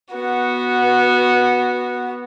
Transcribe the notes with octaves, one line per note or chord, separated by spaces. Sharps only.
B3 F#4